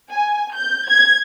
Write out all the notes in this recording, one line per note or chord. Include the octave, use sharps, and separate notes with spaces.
G#5
G6
G#6